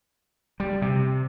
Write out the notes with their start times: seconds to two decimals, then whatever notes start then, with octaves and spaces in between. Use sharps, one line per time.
0.60 G3
0.82 C3